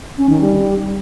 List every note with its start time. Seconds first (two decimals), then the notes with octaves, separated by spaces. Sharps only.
0.18 C#4
0.29 D#3
0.41 G3